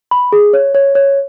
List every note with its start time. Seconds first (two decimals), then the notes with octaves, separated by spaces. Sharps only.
0.11 B5
0.33 G#4
0.53 C#5
0.75 C#5
0.95 C#5